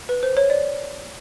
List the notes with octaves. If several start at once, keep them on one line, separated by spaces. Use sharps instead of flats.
B4
C5
C#5
D5